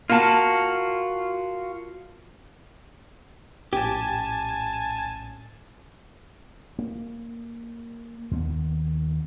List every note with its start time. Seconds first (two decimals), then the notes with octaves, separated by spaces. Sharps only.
0.10 A#3 F4 F#4 A5
3.73 A#1 A2 C#4 G4 G#5 A5
6.79 A#3
8.31 D#2 D#3 G#3 B3